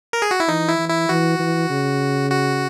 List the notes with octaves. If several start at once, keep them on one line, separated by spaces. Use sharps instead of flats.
A#4
G#4
F#4
E4
E3 D#4
E4
E3
E4
E3 F#4
E3
C#3
F#4